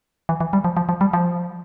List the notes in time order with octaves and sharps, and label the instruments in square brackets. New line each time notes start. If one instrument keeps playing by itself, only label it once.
[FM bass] E3
E3
G3
F3
F3
F3
G3
F3